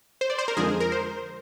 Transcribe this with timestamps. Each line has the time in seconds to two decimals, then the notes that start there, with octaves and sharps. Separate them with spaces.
0.21 C5
0.30 D5
0.38 C5
0.48 A#4
0.57 F2 D3 F3 G#3 G#4
0.80 A#4
0.92 C5